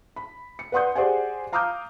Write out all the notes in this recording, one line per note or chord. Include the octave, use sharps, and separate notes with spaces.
B5
C#7
B4 D5 F#5 C6 D#6 G6
G4 G#4 C5 D5 F#5 G#5
F5 A#5 D6 D#6 F6 G6